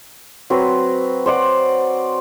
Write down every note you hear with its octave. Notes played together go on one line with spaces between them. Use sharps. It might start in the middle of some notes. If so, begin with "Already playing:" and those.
F#3 C4 B4
C5 D5 F#5